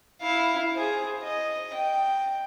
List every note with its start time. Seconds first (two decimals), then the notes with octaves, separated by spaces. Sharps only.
0.22 E4 F5
0.74 G#4 C5
1.24 D#5
1.74 G5